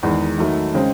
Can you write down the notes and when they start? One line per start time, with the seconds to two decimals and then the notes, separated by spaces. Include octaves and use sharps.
0.03 E2 D#3 G#3
0.38 D#3 F#3 A3
0.74 C#3 G#3 C4